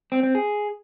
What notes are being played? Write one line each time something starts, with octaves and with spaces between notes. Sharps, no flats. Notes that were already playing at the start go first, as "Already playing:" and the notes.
C4
C4
G#4